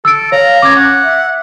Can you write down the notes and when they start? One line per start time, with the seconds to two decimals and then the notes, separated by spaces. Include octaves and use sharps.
0.05 A4 E6 D7
0.32 C#5 F5 A#5
0.62 C#4 D6 G#6
0.76 F#5
1.04 E5